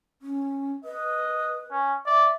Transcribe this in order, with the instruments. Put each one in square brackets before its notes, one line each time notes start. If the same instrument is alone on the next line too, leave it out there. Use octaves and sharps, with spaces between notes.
[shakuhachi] C#4
[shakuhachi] B4 [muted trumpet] D#5
[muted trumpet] C#4
[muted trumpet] D5 [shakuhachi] E5